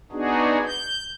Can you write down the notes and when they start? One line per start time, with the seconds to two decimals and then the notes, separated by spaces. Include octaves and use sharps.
0.12 B3 D4 D#4 F#4 G#4
0.66 G6